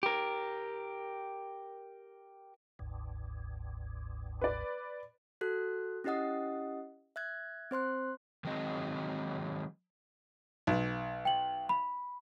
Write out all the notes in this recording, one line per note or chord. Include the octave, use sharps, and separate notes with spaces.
G4 A#4
G1 D2 G#2
B4 D5
F#4 A4 F#6
C#4 E4 G4 D#5 F#5 D#6
E5 F#6 G#6
C4 C5 C6 F#6
D#3 F#3 G#3 C4 D#5
B1
G5 F#7
B5